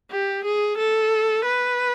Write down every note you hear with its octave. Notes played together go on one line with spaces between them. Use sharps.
G4
G#4
A4
B4